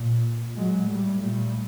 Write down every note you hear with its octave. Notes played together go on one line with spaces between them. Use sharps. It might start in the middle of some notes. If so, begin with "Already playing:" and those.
Already playing: A#2
A2 F#3 G#3
G3 A3
A#2 G3 A3